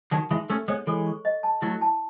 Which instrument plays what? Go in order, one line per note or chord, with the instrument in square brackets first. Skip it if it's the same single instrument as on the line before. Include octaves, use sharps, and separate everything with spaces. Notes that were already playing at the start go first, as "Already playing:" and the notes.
[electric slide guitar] D#3 F#3 [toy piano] D#4
[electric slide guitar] E3 G#3 [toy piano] E5
[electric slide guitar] A3 C#4 [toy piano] A4
[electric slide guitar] G#3 B3 [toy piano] C#5
[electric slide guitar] E3 G#3 [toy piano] A4
[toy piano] C#6
D#5
A5
[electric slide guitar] F#3 A3 [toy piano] E4
[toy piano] A5